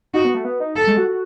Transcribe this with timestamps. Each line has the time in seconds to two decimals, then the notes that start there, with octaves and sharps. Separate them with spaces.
0.14 D#4 F#4
0.25 B3
0.34 A3
0.44 B3
0.60 D#4
0.76 A4
0.87 G#3
0.98 F#4
1.08 F#4